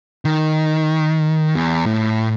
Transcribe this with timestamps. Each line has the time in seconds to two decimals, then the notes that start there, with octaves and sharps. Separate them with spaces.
0.25 D#3
1.55 E2
1.86 A2